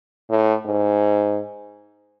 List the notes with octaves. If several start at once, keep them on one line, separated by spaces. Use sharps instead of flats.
A2
G#2